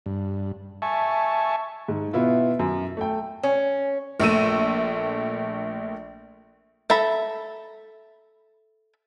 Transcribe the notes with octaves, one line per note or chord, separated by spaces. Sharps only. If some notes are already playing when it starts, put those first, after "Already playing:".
G2
E5 G#5 A5 C#6
G#2
B2 B3 E4 F4
F#2
A3 G5
C#4
A#1 A3 E6 D#7
A4 E5 A#5 B5